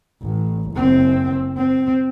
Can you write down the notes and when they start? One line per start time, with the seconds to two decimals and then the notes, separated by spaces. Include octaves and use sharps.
0.22 A1
0.71 F#1 C4
1.57 C4